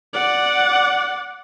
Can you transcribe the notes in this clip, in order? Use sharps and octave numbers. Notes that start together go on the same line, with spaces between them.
D5 F#5